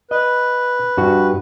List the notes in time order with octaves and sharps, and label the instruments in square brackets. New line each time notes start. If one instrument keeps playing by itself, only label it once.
[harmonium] B4 [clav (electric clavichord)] D#5
[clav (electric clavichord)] G2 F#4